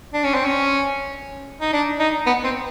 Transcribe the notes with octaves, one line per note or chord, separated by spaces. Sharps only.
D4
C#4
C4
C#4
D#4
D4
D#4
B3
C4